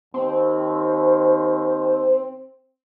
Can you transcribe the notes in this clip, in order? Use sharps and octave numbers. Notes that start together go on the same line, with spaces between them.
D#2 C4